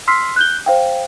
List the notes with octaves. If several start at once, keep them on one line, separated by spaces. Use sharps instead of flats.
C6 E6 F6 B6 C7
F#6 G6 G7
C5 F5 G5